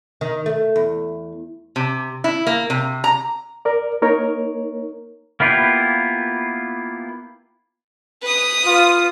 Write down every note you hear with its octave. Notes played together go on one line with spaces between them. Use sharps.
D#3
A3
E2
C3
E4
A#3
C3
A#5
A#4 D5
A#3 D#4 A#4 C#5
A#3 B3 E4 F4 G4
B4 D#6
F4